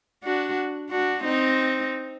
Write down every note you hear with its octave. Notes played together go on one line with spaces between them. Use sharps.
D4 F#4
D4 F#4
C4 D#4